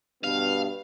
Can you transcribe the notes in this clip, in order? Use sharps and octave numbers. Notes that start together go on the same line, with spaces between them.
G2 B2 B3 F5